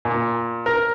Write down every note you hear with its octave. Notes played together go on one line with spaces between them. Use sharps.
A#2
A#4